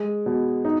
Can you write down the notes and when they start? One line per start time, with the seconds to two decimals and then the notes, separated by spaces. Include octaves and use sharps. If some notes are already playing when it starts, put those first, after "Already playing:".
Already playing: G#3
0.26 B2
0.65 D#4